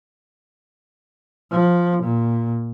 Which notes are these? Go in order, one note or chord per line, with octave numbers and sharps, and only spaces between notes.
F3
A#2